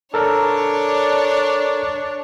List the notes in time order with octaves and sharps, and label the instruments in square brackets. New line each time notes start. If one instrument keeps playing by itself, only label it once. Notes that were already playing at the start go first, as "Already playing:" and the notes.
[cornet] D4 [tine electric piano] A4 A#4 D5 [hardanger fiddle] C#5